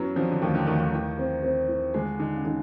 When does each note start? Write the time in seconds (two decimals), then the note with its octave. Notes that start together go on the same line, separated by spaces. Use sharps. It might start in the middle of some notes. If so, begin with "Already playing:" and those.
Already playing: F#2 E3 F#3 B3
0.15 F2 F3 D4
0.31 D3
0.41 D#2 D#3 A3
0.55 D3
0.67 D#2 D#3 A3
0.79 D#2 D#3
0.93 E3
1.18 C4
1.43 C4
1.68 E3
1.94 D3 G#3
2.19 D3 D#4
2.36 C#3
2.45 D3 D#4